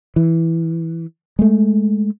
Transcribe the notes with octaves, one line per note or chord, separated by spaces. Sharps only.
E3
G#3 A3